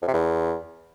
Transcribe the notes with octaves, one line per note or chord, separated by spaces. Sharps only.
F2
C3
E2